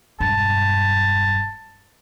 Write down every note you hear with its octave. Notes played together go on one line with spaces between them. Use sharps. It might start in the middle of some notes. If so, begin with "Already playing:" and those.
E1 G2 A5